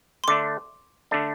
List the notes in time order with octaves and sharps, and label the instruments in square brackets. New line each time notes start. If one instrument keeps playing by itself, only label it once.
[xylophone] C6
[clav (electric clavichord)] D3 A3 D4 [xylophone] D6
[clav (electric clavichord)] D3 A3 D4